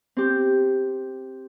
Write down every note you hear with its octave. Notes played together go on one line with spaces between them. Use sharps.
C4 G4